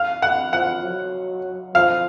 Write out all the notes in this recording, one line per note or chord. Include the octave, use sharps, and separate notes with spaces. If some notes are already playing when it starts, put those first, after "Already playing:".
Already playing: F5
F#5
F3 F#5
F#3
F3 F5